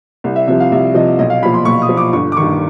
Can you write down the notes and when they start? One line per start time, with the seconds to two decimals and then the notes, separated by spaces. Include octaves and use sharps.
0.24 C2
0.36 E5
0.48 C3 F3 E5
0.60 F5
0.72 C2 E5
0.94 C3 F3 D#5
1.19 B1 D#5
1.30 F5
1.43 A#2 B5
1.45 F3
1.54 C6
1.65 B1 C#6
1.82 D#6
1.89 A#2 F3
1.97 D6
2.13 G1 C#6
2.32 D6
2.37 G2 D#3 C#6